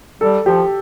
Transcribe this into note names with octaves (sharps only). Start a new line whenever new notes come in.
G3 A4
F3 G4